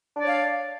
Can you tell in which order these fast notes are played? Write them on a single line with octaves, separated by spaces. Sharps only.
D4 D5 C#5 F5